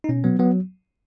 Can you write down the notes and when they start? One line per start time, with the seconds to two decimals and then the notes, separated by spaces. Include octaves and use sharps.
0.04 D#4
0.09 B2 C#4
0.24 F#3 B3
0.39 F#3 B3